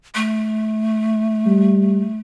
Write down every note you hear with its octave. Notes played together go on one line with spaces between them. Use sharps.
A3
G3